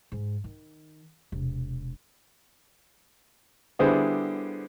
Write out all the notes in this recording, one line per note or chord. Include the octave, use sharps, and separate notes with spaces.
G#2
D#3
E1 C3
D3 G3 B3 E4 G#4 C5